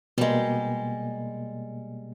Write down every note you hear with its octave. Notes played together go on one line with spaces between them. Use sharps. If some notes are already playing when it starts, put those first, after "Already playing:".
B2 G3 G#3 A#3